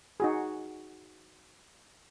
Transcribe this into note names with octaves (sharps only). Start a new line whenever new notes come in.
D#4 F#4 G#4